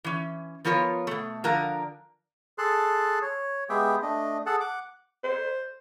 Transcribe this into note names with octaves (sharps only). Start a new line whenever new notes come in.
E3 C#4
F3 B3 F4 A#4 C#5
B2 A3
D3 F3 A#4 F5 A#5
G#4 A4 A5 C6 F#6
C#5
G#3 B3 G4 G#4 E5 G5
A3 D4 D#5
G#4 A4 F#5 A5
F#5 D6
C5